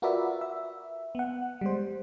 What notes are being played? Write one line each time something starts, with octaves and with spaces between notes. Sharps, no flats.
F4 F#4 A#4 B4 D5 E5
E5
B3 F#5
G3 G#3 C5